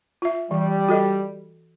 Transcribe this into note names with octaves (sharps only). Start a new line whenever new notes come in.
F4 E5
E3 G3
F#4 A4 D#5